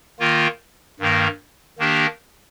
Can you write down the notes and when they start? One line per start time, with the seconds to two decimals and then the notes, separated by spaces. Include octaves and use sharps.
0.20 D#3 A#3 F4
1.00 G2 D#3 A#3
1.79 D#3 A#3 D4 G4